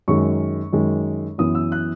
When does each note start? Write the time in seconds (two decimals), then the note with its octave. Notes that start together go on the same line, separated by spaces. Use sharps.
0.08 F#2 D#3 G#3 C#6
0.73 F#2 D#3 G#3
1.38 F#2 E3 B3 D#6
1.55 E6
1.72 F#6